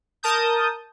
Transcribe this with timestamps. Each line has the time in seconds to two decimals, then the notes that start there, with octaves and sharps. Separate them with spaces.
0.23 A#4 A5 D#6 G6